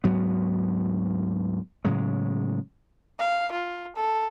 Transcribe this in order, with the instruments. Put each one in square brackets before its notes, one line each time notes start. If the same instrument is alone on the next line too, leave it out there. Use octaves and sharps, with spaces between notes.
[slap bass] D2 G#2 F#3 B3
A2 C#3 F#3 G#3
[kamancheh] F5
F4
A4